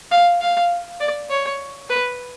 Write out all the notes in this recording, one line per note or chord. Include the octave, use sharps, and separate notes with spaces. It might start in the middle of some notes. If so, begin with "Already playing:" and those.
F5
F5
D5
C#5
B4